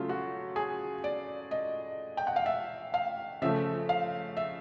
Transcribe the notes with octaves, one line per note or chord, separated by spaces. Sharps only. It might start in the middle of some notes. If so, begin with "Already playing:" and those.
Already playing: C#3 F#3 A3 F4
F#4
G#4
D5
D#5
G5
F#5
F5
E5
F5
C#3 F3 A3 E5
F5
E5